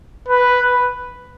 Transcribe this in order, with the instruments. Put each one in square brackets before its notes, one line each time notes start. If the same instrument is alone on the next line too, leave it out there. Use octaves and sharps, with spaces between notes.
[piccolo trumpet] B4